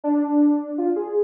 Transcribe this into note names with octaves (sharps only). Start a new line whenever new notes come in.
D4
F4
G#4